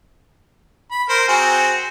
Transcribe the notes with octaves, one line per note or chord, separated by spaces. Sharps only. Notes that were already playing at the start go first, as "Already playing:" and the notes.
B5
A#4 C5
C4 F#4 G#4